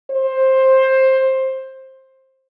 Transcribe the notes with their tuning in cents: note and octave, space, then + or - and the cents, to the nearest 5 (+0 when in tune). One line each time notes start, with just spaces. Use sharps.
C5 +15